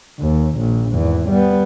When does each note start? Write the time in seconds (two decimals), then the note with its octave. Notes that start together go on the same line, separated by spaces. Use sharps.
0.19 D#2
0.57 A#1
0.91 G#1 E2
1.30 G3 B3